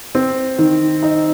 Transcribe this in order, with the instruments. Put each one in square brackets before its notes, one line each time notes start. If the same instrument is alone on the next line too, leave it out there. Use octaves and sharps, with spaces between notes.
[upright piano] C4
D#3
D#4